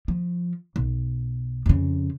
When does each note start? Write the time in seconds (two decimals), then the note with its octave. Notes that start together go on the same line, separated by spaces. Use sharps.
0.08 F3
0.76 B1
1.66 F2 C#3